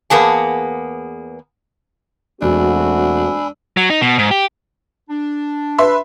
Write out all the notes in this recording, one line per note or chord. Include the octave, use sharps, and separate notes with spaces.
E2 A#3 B3 G#4 A5
E1 A3 C4 D4 F#4 G#5 B5 E6
F#3
D#4
B2
G#2
G4
D4
B4 E5 C6